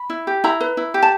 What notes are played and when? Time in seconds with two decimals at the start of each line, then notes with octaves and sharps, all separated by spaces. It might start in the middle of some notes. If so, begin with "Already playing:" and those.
Already playing: B5
0.10 E4
0.27 G4
0.44 E4 A#5
0.61 B4
0.77 E4
0.94 G4
1.02 A5